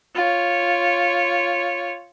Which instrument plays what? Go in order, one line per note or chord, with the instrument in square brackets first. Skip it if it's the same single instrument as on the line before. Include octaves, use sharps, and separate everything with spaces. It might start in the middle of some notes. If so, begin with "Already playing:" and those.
[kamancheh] F4 C#5